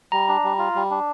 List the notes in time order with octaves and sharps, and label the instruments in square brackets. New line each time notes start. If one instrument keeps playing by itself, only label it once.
[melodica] G3 [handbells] A#5
[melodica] D4
G3
F4
G3
D4